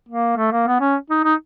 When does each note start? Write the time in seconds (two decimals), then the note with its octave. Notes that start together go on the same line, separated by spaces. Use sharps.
0.09 A#3
0.37 A3
0.52 A#3
0.67 B3
0.81 C#4
1.10 D#4
1.25 D#4